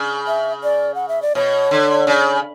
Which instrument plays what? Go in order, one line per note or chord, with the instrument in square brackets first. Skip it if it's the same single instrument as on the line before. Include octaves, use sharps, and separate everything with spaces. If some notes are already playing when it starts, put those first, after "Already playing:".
Already playing: [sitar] C#3
[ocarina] E5
D5
F#5
E5
D5
[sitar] B2 [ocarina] C#5
[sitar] D3
C#3